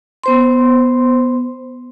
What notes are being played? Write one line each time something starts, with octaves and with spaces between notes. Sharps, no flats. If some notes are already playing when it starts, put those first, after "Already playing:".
B3 C5 C6